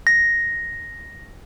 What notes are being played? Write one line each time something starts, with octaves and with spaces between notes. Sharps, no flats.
A#6